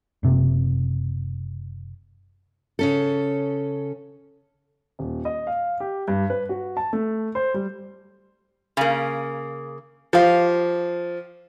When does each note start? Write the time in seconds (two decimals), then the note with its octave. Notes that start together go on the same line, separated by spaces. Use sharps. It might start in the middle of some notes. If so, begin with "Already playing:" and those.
0.23 F#1 C3
2.79 C#3 C#4 A4
4.99 D#1
5.25 D#5
5.47 F5
5.80 G4
6.08 G2
6.30 B4
6.49 F#4
6.77 A5
6.93 A3
7.35 C5
7.54 G3
8.77 C#3 A#3
10.13 F3 G4 F5